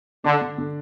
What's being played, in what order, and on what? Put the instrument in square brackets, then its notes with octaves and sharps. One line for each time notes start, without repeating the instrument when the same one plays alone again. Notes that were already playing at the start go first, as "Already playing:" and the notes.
[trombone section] D3 [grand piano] D4
[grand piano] D3
D3